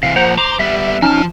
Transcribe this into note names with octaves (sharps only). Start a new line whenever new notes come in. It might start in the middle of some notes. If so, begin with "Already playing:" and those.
C3 E3 F5
F3 A#3 C5 F#5 A#5
C5 A#5 D6
G3 B3 E5
F3 C#4 D#4 A5 F6